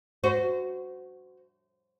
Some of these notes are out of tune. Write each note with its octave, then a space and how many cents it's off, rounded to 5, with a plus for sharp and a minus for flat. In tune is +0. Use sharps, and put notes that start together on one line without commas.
F#4 +0 C5 -25